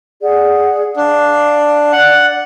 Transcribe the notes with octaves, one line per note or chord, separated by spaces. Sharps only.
G#4 D5 F#5
D4 F5
D5 F#5